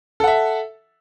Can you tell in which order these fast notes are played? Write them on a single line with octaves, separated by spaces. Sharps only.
A4 F#5 E5